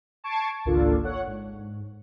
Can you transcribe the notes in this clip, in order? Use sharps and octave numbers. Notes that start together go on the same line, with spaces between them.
A5 C#6 G#6 C7 D7
G#1 C#2 A#3 D4 F4 A4
C#5 F#5
G#2